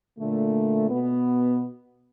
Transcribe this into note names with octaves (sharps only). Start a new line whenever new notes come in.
A#2 D3 A3
B2 B3